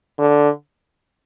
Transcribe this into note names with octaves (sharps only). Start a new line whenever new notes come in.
D3